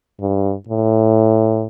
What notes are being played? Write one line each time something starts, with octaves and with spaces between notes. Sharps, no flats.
G2
A2